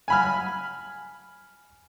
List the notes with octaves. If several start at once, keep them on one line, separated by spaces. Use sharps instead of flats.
G#5 B5 F6